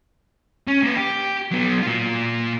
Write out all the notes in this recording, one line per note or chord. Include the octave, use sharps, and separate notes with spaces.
C#4
A#3 B4
G4
F#3 B3
A#2 F4